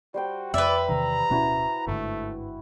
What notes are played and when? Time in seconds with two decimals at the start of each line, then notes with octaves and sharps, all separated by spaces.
0.14 G3 F#4 C5 G5
0.54 F2 B4 D5 E5
0.89 E2 C3 D#3 A#5
1.30 D1 B2 C#4 E4 F#4 D#5
1.87 G1 G#2 D3 A3